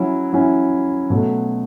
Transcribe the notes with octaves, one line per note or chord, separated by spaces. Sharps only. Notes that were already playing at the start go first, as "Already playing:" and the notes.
Already playing: F#3 C#4 E4
F#3 C#4 E4
B2 F#3 A3